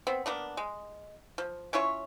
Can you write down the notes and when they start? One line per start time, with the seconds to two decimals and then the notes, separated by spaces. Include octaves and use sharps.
0.07 B3 C4
0.26 A#3 B3 D4
0.57 G#3
1.38 F3
1.73 C#4 E4 F4 C#5